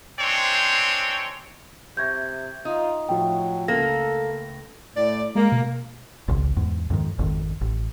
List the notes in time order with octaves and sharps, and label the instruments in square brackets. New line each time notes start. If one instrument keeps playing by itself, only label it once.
[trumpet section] G#3 C4 D4 C5 C#5 G5
[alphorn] C3 [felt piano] E5 C#6 A#6 [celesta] G6 G#6
[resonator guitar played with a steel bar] D#4 [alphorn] F4
[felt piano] A2 F3 F4 [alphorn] F#3 [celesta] G5
[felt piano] C#2 A3 [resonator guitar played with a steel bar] A#3 [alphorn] A4 [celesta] A#6
[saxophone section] A2 D5
[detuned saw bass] G#3 [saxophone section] A#3
[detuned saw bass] B2
[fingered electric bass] G#1 C#2
E2 G#2
F2 G#2 D#3
G#1 F2 D#3
A1